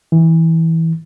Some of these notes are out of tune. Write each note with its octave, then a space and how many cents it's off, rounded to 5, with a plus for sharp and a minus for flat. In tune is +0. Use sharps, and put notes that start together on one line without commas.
E3 -15